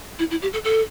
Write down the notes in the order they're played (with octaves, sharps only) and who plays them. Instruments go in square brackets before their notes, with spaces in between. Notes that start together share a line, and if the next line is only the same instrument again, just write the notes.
[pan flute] E4
E4
G4
A4
A4